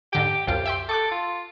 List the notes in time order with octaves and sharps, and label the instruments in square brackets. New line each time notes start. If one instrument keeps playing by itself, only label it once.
[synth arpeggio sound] G#2 D3 G5 [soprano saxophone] G4
[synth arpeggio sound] C2 F#2 F4 [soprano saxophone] G4
[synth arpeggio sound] E5 G5 C6
[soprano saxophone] A4 [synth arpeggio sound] C#6 D6 F#6
[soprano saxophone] F4